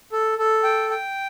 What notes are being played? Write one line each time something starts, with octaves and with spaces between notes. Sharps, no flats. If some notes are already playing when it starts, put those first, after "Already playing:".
A4
A4
G5
G5